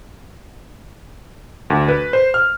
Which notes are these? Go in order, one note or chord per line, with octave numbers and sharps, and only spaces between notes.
D2
B4
C5
F6